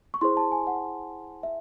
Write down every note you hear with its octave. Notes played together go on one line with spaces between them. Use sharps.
C#6
E4 G#4 C5 C6
A5
G#5
F#5
E5